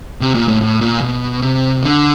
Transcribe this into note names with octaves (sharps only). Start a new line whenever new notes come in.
C3
A#2
A2
A2
A#2
B2
C3
D3